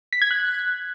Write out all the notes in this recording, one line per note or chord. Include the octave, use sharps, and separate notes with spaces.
B6
G#6
F#6